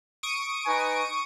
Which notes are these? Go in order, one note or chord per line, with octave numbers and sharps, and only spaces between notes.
C#6 D#6 D7
D#4 B4 G#5